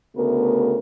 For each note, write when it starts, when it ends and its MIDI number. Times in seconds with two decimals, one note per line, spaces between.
0.16 0.79 38
0.16 0.79 49
0.16 0.79 57
0.16 0.79 59
0.16 0.79 66
0.16 0.79 70